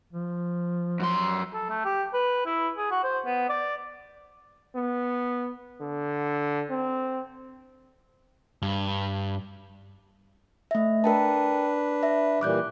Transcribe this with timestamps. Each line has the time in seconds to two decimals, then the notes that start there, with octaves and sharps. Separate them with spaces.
0.13 F3
1.00 F#2 C6
1.54 A4
1.70 A3
1.85 G4
2.14 B4
2.46 E4
2.77 G#4
2.91 F#4
3.04 C5
3.25 B3
3.49 D5
4.76 B3
5.81 D3
6.70 C4
8.62 G2
10.71 A3 E5
11.04 D4 A#4 B4 G5 A5
12.03 E5
12.41 A#2 E3 G3 D6 F#6 G6